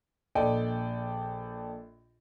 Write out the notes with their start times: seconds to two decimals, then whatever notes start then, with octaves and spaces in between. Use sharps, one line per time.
0.35 A#1 A4 D5 D#5 G5